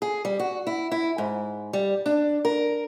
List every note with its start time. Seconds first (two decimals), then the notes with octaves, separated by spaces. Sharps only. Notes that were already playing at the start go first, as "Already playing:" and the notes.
0.02 G#4
0.25 G3
0.39 F#4
0.67 E4
0.92 E4
1.18 G#2
1.73 G3
2.06 D4
2.45 A#4